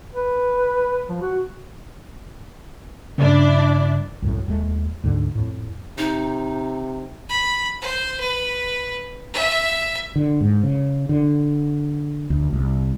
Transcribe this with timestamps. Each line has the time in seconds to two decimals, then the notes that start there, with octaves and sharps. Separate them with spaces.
0.14 B4
1.09 F3
1.22 F#4
3.18 G2 C#3 D4 E4 D5
4.22 C2 F#2 A2
4.48 D#1 D#2 G#3 A3
5.04 D2 G#2 D3
5.35 F2 A2
5.98 C3 D#4
7.29 B5
7.82 C5
8.20 B4
9.34 E5
10.16 D3
10.41 G#2
10.63 C#3
11.09 D3
12.30 D2
12.53 C2